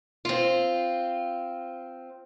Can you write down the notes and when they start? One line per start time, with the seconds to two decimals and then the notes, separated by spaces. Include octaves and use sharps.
0.25 C4 F4